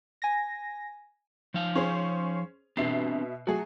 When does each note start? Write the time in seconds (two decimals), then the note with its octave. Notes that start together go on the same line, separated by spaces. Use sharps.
0.22 G#5 A#6
1.54 F3 D#4 F5
1.75 C#4 G#4 C5
2.77 B2 C4 D4 G4 E5 C7
3.47 F#3 A3 F#4 G#4